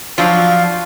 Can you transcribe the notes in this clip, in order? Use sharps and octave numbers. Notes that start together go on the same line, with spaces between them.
F3 F#3 D4 F5